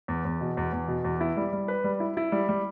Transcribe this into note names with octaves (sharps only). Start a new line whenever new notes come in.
E2
E2
B2
E2
E2
B2
E2
E4
G3
G3
B4
G3
E4
E4
G3
G3